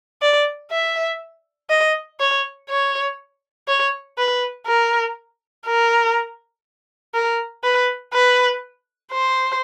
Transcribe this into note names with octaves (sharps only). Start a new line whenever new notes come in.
D5
E5
D#5
C#5
C#5
C#5
B4
A#4
A#4
A#4
B4
B4
C5